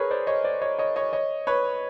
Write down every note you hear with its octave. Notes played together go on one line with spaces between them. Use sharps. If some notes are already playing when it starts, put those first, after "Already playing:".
Already playing: G#4 A#4 B4 C#5
C5 D5
C#5 D#5
C5 D5
C#5 D#5
C#5 D#5
C#5 D#5
C#5 D#5
B4 C#5